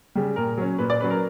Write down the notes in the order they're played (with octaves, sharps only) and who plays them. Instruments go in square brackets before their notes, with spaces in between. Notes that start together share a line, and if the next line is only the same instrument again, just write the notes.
[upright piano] C#3 G3
A#2 A#4
F#3 C#4
A#2 B4
D5
F#3 C#4 B4
A#4